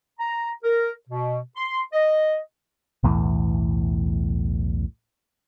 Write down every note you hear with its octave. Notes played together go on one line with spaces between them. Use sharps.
A#5
A#4
B2
C6
D#5
B1 E2 A2 E3